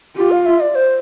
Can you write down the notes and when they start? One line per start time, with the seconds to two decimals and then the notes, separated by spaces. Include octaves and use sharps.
0.17 F4 G4
0.31 F5
0.46 E5
0.60 D5
0.75 C5